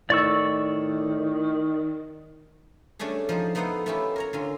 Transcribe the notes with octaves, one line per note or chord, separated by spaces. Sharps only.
A2 D#3 D5 C#6 E6
G3 A3 C#4 D4 G#4
F3 D#4 C5
A3 B3 D#4 F4 C5 F#5
A3 B3 C#4 E4 F4 G4
A#4 C#5 A#5
D3 C#4 F4